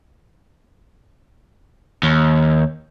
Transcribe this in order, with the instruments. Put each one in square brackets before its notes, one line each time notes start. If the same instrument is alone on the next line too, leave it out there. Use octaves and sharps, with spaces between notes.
[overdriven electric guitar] D#2